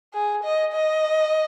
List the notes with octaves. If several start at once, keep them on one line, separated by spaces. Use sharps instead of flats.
G#4
D#5
D#5